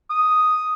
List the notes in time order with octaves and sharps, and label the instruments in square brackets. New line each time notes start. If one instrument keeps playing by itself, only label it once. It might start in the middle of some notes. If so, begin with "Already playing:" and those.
[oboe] D#6